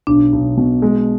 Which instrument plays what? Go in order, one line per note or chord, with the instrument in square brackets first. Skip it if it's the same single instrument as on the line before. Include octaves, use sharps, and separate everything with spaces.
[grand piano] B1 [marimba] D4
[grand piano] B1
B2
G#3